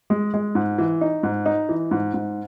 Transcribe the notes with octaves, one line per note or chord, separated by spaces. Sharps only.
G#3
G#3
G#2
E3
D#4
G#2
D#4
E3
G#2
G#2